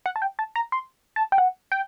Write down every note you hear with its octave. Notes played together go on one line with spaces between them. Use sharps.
F#5
A5
G5
A5
A#5
C6
A5
G5
F#5
G5